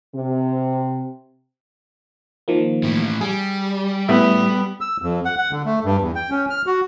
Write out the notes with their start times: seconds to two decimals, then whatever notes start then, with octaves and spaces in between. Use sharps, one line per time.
0.14 C3
2.48 D#3 F3 A#3
2.83 A2 E3
3.21 G3 G#4
4.08 A2 A3 B3 E5
4.81 E6
5.02 F2
5.25 F#5
5.39 F#5
5.51 D3
5.65 A3
5.85 G2
6.01 E2
6.15 G5
6.30 C#4
6.50 F6
6.66 F#4